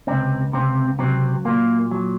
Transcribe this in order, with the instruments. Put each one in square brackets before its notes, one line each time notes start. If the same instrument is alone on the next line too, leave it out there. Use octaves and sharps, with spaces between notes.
[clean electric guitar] C#2 C3 C4
C#2 C3 C4
C3 F#3 C4
A#2 A#3
F#3